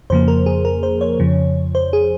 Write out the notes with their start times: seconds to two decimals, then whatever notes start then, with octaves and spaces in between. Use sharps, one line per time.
0.10 F2 C#3 F3 A#3 C5
0.28 A#4
0.46 G#4
0.65 A#4
0.83 C5
1.01 C#5
1.20 F2 C#3 F3
1.75 C5
1.93 G#4